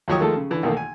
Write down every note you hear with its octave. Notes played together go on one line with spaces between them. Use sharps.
D#2 F3 F#3 G4 C#6 D#6
D#3 F3 G#3 A3 A4
C#3
D3 E3
B1 D#3 A3 A#3
G#5